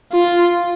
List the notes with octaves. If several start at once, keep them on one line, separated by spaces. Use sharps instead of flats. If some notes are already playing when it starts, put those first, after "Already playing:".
F4